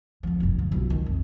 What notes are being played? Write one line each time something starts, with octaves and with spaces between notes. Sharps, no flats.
F2 F3
F#1 C2
D1 D2
B1 F4
D#3
F2